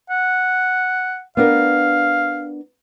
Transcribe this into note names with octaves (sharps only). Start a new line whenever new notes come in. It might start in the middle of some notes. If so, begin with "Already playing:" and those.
F#5
B3 D4 A#4 F5